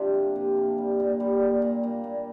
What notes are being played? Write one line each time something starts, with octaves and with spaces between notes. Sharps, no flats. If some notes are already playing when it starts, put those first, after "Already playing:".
Already playing: C3 F3 D4
A#3
C3
A#3
G3
A#2
G3
A#2
A#2
A#3
A#2